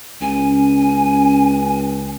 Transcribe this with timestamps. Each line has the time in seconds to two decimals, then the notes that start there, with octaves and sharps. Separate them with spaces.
0.21 C#2 C#4 G#5